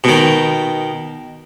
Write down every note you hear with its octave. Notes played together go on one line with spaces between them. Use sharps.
B2 D#3